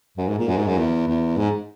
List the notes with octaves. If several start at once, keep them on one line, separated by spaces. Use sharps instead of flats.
F#2
G#2
A#2
F#2
G#2
F#2
E2
E2
G#2